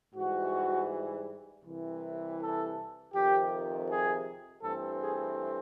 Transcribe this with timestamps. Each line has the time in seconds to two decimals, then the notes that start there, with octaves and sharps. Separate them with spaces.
0.15 G#2 E3 G3 F#4
1.64 C2 C3 E3
2.39 A4
3.13 F2 C3 D#3 G4
3.88 G#4
4.62 G2 E3 A3 C4 A4
5.01 G#4